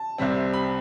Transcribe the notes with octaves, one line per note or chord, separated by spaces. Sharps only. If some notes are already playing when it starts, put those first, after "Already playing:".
Already playing: A5
C2 C3 G3 C4
B5